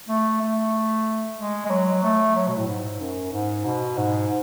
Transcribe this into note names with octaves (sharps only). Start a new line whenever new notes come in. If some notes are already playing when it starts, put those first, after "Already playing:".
A3
A3
G#3
G#3
F#3
A3
F#3
B2
A2
G#2
F#2
G#2
B2
G#2